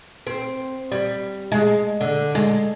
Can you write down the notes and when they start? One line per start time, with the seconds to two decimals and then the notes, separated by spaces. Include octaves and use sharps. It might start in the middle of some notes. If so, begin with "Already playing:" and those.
0.27 C4
0.92 G3
1.52 G#3
2.01 D3
2.35 G#3